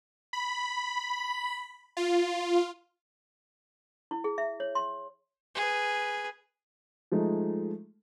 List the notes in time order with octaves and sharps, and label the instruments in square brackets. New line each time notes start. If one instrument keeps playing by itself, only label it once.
[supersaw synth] B5
F4
[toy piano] E4
G#4
E5
C#5
C6
[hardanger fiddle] G#4 B4
[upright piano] F3 G#3 A3 D#4